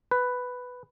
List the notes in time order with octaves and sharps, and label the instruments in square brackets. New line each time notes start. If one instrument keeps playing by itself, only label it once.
[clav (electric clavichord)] B4